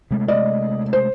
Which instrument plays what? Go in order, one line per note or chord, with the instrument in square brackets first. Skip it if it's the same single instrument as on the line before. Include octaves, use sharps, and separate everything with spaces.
[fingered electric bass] C3 G#3 A3
[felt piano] D5 D#5
C5